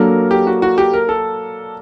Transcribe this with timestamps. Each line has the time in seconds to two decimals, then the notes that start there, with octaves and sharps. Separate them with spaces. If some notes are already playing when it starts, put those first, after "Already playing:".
Already playing: F#3 A#3 D4 A4 A#4
0.31 G4
0.47 F#4
0.62 F#4
0.78 G4
0.93 A#4
1.09 A4